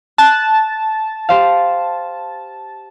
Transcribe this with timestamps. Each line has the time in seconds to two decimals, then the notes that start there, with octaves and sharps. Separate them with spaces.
0.18 A5 F#6
1.29 G4 C5 F5